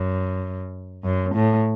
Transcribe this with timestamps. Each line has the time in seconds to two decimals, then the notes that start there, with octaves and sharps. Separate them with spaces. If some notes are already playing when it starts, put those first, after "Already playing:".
Already playing: F#2
1.04 F#2
1.35 A2